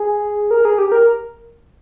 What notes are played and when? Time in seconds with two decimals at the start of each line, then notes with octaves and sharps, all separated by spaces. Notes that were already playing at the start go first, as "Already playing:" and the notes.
Already playing: G#4
0.51 A#4
0.65 G#4
0.78 G4
0.92 A#4